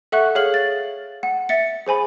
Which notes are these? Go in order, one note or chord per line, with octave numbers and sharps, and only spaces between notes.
A4 E5 F#5 C#6 F#6
G#4 C#5 F5 F6 F#7
A6
F#5
E5 A6 C#7
G#4 C5 G#5 B5